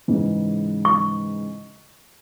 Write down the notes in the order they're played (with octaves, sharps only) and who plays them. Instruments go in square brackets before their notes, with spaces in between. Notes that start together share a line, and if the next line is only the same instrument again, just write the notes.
[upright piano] G#2 C#3 E3
[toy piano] C#6